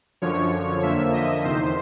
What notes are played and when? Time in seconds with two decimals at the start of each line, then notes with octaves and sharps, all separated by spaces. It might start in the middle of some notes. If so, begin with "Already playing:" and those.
0.22 F#2 D3 F3 C#5
0.83 F2 D3 F3 A#3 E5
1.13 D#5
1.44 E2 C3 D#3 C5